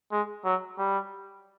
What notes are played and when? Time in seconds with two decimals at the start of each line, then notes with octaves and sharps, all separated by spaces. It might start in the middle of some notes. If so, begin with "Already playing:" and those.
0.12 G#3
0.45 F#3
0.78 G3